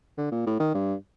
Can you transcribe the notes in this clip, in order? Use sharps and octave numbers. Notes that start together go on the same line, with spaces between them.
D3
A#2
A2
D#3
G2